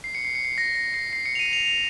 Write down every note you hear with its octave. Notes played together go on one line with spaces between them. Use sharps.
C7
C#7
C7
C#7
C7
A#6
A#6
C7
C7
C#7
F7
D#7
F7
F7